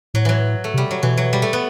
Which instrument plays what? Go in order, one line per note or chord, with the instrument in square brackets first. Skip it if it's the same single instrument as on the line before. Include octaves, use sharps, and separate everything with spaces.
[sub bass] A2 [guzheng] F#3
[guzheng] E3 F#3
A3
[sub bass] C3 [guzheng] G3
[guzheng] F#3
[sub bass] B2 [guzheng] E3
[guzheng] F#3
G3
A3
B3